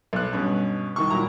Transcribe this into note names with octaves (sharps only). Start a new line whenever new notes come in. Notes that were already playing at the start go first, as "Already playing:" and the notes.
B1 F#6
G2 B2 C#4
C2 D#3 C#6
A#2 F#3 E4 A#4 A#5